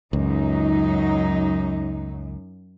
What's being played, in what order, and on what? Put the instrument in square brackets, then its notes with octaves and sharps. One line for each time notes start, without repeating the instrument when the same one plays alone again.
[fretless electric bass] C#2 [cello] F#2 [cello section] F#3 D#4